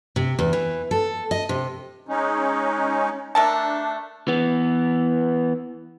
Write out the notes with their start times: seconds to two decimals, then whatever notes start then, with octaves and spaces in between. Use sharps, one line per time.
0.16 C3
0.39 E2
0.53 E3
0.91 A4
1.31 D#5
1.49 C3
2.09 G#3 C#4 D#4
3.35 A3 D4 A#4 A5
4.28 E3 B3